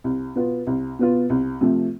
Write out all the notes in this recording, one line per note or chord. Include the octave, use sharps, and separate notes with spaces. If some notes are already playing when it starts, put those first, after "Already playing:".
C2
B2 B3 F4
C2
B2 B3 F4
C2
C3 F3 A3